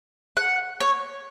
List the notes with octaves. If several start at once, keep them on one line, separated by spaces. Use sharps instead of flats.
F#5
C#5